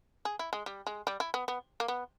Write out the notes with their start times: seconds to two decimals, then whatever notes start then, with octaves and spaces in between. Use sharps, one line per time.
0.25 G#4
0.39 E4
0.53 G#3
0.66 G3
0.87 G#3
1.07 G3
1.20 E4
1.34 B3
1.48 B3
1.80 A#3
1.88 B3